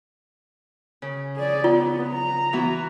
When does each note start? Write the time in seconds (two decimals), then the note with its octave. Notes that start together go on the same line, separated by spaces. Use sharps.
1.02 C#3
1.36 G#4 D5
1.64 B3 F4
2.08 A#5
2.53 E3 B3 F#4